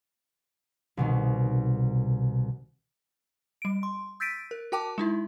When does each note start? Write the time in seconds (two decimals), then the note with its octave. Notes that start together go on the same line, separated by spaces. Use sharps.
0.97 C2 B2 D#3
3.62 G3 D7
3.83 C6
4.20 E6 G6 A6 B6 D7 D#7
4.51 A#4
4.72 F#4 A#4 G5 A5 D6
4.98 G#3 D#4 E4